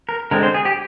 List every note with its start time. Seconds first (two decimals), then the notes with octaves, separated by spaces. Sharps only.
0.09 A#4
0.31 D3 G#3 C4 A#4
0.43 C5
0.54 G#4
0.65 G4